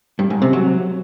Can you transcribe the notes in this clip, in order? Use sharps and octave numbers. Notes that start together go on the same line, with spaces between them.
G2
G#2
C3
F#3